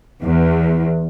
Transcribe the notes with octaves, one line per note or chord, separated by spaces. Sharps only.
E2